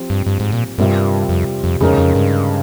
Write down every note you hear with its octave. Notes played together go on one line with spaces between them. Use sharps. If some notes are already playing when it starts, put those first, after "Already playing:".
Already playing: F3 C4 G4
G2
G2
G#2
A#2
G2 C3 G3 C4 F4 A#4
F2
F2
F2 C#3 G#3 D#4 A#4 C#5
F2
G2